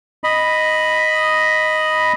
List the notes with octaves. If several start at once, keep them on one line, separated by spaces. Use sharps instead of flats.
D#5 B5